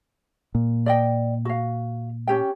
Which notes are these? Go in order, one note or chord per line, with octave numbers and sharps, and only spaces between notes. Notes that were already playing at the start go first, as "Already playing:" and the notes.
A#2
D5 D#5 G5
F#4 F5
C#4 G4 G5